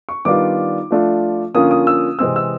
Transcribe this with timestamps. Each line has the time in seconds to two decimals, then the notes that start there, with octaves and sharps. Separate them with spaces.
0.09 C#6
0.25 D#3 G3 B3 D4 F4 D6
0.91 F3 A3 D4 F4
1.54 D3 F3 A#3 C#4 F4 D#6
1.71 D#6
1.87 E6
2.19 C3 E3 G#3 C4 E6
2.36 E6